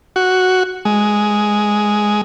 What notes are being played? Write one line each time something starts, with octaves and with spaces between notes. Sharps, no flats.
F#4
G#3